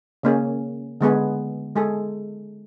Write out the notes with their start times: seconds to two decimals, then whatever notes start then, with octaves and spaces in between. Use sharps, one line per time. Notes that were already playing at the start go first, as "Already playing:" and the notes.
0.23 C#3 A#3 C#4 G#4
1.01 D3 G#3 B3 G#4
1.76 G#3 G#4 A4